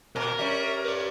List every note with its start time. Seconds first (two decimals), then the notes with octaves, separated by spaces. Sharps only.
0.16 A#2 A#4
0.39 G3 C#4 E5
0.84 B4 D5